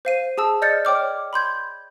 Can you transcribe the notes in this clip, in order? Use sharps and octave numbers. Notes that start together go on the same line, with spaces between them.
C5 F5 D#7
G#4 A5 E6
D5 D#5 F6 G6 A6 C#7
C#5 G5 D6 F6
B5 C6 G6 G#6